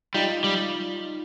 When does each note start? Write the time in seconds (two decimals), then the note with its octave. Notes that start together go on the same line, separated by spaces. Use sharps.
0.14 G3 D#4 F4
0.44 G3